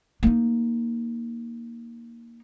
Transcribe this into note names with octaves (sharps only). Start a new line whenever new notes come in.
A#3 D#4